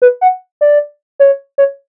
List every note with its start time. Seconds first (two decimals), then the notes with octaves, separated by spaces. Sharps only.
0.02 B4
0.21 F#5
0.61 D5
1.20 C#5
1.58 C#5